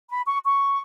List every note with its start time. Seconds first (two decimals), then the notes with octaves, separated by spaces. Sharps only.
0.09 B5
0.26 C#6
0.43 C#6